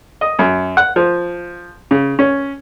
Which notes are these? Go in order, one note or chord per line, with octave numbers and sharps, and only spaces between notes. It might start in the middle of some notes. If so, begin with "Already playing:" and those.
D#5
F#2
F#5
F3
C#3
C#4